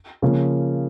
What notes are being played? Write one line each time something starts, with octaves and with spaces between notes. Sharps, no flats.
C#3 F3 A#3